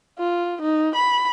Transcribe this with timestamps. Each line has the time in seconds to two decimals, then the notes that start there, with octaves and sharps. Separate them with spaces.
0.18 F4
0.62 D#4
0.95 B5